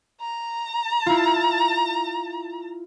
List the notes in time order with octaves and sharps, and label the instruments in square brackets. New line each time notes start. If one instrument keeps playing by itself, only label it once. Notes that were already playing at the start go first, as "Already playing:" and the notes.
[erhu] A#5
[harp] E4 F4